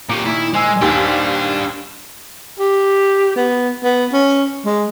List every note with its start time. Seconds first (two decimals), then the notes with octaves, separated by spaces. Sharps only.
0.09 A#2 G4 A#5 C#6 D6
0.25 A#2 D#3 E4 D6
0.53 G#3 C5 G#5 E6
0.81 D#2 D4 G4
2.59 G4
3.36 B3
3.83 B3
4.12 C#4
4.66 G#3